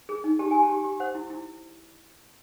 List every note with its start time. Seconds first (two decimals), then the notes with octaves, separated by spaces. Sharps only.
0.09 G#4
0.24 D#4
0.39 G4 A5
0.51 G4 G#5
0.63 A5
0.70 G4
0.84 G4
1.00 C5 F#5
1.15 E4
1.30 E4